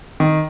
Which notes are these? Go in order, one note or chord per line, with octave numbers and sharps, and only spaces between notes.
D#3